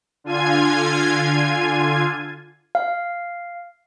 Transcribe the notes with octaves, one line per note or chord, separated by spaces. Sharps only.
D3 F4 G#5 G#6
F5